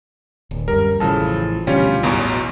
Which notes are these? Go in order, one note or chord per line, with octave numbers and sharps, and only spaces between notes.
D1
F#2 G3 A#4
A1 C#3 E3 F3 A4 A5
D2 B2 G3 C#4 F4
A1 E2 B2 F#3